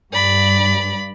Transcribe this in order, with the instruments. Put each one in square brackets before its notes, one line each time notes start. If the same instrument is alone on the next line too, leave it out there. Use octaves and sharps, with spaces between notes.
[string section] G2 [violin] D5 B5